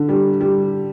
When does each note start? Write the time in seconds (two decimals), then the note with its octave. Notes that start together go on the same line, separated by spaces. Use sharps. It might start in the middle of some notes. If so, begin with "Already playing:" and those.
Already playing: D3
0.09 G3
0.41 G3